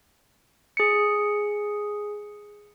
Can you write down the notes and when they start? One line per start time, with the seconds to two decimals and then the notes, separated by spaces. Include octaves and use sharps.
0.77 G#4 C#7